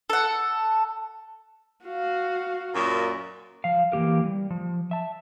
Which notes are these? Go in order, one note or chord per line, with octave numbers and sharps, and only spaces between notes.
A4 F#5
F#4 F5
F#2 A#2
F3 F5
E3 A#3 G4 A#4
G3
F3
E5 A5